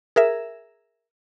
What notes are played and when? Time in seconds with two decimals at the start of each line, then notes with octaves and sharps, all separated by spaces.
0.16 G#4 A#4 E5